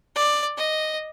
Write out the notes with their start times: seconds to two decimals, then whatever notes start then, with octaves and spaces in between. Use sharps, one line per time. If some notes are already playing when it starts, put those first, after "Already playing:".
0.15 D5
0.57 D#5